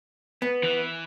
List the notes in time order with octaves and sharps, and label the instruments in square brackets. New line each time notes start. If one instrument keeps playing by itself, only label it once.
[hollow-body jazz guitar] B3
[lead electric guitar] E3